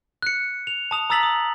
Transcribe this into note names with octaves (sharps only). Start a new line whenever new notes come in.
F#6 C#7
F7
A5 D#6 F7
A#5 D#6 E6 A6 B6 F#7
D#6